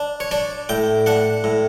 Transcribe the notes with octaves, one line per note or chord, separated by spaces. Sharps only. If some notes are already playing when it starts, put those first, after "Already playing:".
Already playing: D4
C#5
D4 D5
A2 G5
D4 F#5
A2